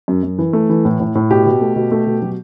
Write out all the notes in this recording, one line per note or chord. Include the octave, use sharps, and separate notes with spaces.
F#2
F#2
E3
A3
E3
A2
A2
A2
B2 G4
B2
A3
B2
A3
B2
F#3